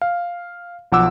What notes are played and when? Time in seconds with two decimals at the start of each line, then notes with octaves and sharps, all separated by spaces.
0.02 F5
0.92 B1 F3 F#5 D6 E6